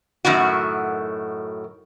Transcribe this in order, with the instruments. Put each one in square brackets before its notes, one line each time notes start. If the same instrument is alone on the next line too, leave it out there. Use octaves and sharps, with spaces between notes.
[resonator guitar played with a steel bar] F#2 A2 D#3 F#4